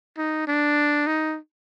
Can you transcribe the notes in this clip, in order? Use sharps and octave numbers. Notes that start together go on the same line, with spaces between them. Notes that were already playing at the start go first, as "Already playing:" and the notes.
D#4
D4
D#4